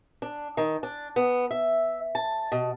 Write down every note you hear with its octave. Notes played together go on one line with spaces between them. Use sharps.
D4
D#3
D4
B3
E5
A5
B2